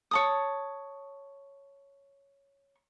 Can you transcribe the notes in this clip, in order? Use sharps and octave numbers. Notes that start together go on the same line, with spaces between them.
C#5 A5 D#6